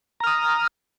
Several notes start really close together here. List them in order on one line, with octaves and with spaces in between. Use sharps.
A#5 F6 D#6